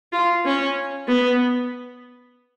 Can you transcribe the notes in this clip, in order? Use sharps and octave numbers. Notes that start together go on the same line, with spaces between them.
F4
C#4
B3